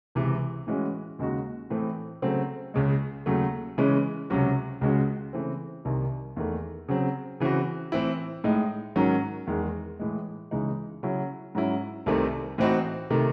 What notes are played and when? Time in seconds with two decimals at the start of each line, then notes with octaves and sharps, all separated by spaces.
0.15 C#2 C3 E3
0.67 A2 E3 G#3 C#4 F#4
1.19 D#2 C#3 G#3 D#4 F#4
1.70 A2 E3 A3 C4
2.22 C#3 F#3 A3 C4
2.74 C#2 C#3 G#3
3.26 D#2 C#3 F#3 A3
3.78 C#3 E3 G#3 C#4
4.30 C#2 C3 F#3 C#4 F#4
4.81 C#2 C#3 G#3 C#4 F#4
5.33 C#3 E3 A3 C4
5.85 C2 C3 D#3
6.37 E2 D#3 A3
6.88 C#3 F#3 C4
7.40 C#3 E3 C4 F#4
7.92 A2 E3 C4 E4
8.44 A2 G#3 D#4
8.96 G#2 D#3 F#3 C#4
9.47 E2 D#3 G#3
10.00 A2 E3 G#3
10.51 C#2 C#3 E3 G#3 D#4
11.03 C#3 F#3 C#4 E4
11.55 G#2 F#3 C#4 E4
12.06 C2 C3 D#3 A3 C4
12.58 A2 E3 C4 D#4 F#4
13.10 C3 D#3 A3